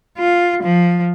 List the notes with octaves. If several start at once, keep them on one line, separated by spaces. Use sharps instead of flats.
F4
F3